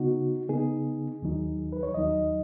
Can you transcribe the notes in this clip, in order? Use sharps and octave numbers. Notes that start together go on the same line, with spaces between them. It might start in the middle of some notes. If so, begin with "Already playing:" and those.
Already playing: C#3 B3 D#4 F#4
C#3 B3 D#4 G#4
D#2 D#3 F#3 D#4
B4
C#5
D#2 D#3 F#3 D#4 D#5